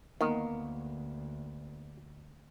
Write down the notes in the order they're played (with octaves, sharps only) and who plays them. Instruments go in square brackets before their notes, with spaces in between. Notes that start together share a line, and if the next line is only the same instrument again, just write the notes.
[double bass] D2 [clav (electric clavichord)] D#3 [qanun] A#3 B3